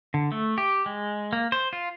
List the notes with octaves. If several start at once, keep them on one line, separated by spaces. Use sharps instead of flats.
D3
A3
G4
G#3
A#3
C5
F4